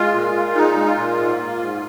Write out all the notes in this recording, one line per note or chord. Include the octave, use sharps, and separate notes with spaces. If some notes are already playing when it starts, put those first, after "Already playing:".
Already playing: G#3 F4
A#2
A#2
G#3 D#4
G#3
F4
A#2
G#2
A#3
G#2